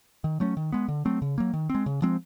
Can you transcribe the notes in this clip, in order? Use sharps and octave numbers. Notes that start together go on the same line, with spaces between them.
D#3
F#3 A3 C#4
D#3
G#3 B3
D3
F#3 A3 C4
C#3
F#3 A#3
D#3
C4
G#3
C#3
F3 G#3 C4